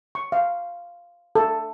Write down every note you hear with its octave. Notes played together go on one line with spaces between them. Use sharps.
C#6
F5
A4